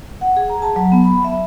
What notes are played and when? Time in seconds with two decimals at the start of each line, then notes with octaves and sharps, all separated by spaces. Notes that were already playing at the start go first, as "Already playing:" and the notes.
0.21 F#5
0.37 G#4
0.49 A#5
0.62 A5
0.76 F#3
0.92 B3
1.04 B5
1.24 E5